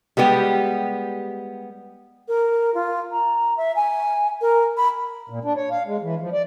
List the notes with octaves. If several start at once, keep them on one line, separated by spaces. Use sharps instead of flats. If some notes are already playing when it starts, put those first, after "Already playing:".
G3 G#3 B3 G4
A#4
F4
A#5
E5
G#5
A#4
B5
A#2
D4
C#5
F5
G#3
E3
F3
D5